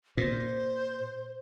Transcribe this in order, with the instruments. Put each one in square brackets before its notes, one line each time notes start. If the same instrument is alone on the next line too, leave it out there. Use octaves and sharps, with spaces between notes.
[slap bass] A#2 [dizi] C5